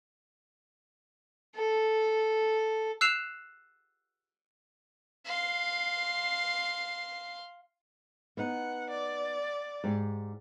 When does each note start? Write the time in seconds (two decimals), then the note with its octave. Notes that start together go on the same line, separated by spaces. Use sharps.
1.56 A4
3.01 E6 F#6 C7 E7 F7
5.25 F5 C6
8.37 B3 D#4 F#5
8.90 D5
9.84 G#2 G4